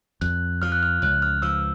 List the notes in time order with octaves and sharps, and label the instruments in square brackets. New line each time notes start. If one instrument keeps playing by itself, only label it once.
[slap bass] F2 [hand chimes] F#6
[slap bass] F3 [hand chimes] F6
[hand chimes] F#6
F6
[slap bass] C#2 [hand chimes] F#6
[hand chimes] F6
[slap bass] F3 [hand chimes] E6